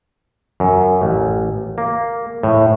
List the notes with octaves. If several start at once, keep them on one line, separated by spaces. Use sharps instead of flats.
F#2
A1
A#3
A2